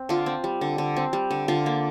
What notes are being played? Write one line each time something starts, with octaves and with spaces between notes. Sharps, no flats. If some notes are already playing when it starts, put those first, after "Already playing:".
Already playing: C4
D3 F4
C4
G3
D3
D3
C4
G3
D3
D3 F4
A#3